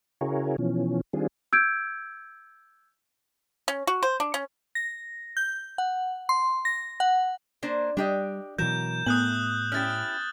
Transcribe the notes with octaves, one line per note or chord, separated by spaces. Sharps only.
C#3 E4 F#4 G#4 A#4 C#5
B2 E3 F3 C#4
D#3 G3 C4 D4 F4 G#4
E6 G6 G#6 D7
C#4
F#4
C5
D4
C#4
A#6
G6
F#5
C6
A#6
F#5
A#3 D4 C5
G3 D4 G4 D#5
B2 E3 F#3 A#4 G6 E7
A2 A3 B3 D#6 F#6 F#7
C#4 E4 G4 F6 A6